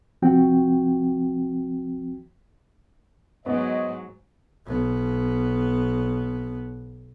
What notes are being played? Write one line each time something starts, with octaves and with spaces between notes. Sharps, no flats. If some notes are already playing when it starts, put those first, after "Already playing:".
C2 F3 C4 F#4 G5
G#2 F#3 B3 C5 C#5 D#5
B1 B3